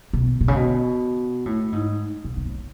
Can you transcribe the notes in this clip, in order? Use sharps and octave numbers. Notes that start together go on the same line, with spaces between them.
B2
B2
C#3
B2
A2
G#2
B2
B2
C#3